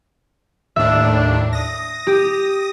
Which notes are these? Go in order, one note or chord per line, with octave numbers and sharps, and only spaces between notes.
D#2 A2 D4 E5
D#6 A#6
G4